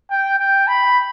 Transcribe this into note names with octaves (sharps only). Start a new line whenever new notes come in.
G5
G5
B5